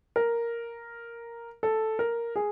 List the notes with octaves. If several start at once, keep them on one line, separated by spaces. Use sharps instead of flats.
A#4
A4
A#4
G#4